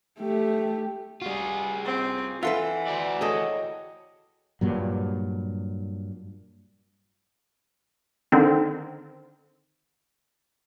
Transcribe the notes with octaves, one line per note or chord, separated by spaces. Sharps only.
A3 G4
G3 F4 F#4 G#4
C4
E3 F4 A4 B4 E5 F#5 C6
F#4 D5
G#4 A4 C#5 D#5 G5
G2 A#2 F#3
D3 D#3 C4